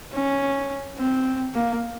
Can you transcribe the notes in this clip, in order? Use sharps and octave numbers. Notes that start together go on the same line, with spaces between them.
C#4
C4
A#3